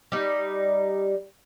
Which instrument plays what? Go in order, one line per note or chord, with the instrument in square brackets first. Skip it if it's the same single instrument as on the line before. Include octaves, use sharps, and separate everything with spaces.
[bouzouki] G3 D#4